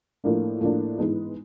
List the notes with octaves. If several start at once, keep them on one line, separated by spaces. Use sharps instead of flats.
A2 F3 A#3 D4
A2 F3 A#3 D4
G#2 E3 G#3 B3 D#4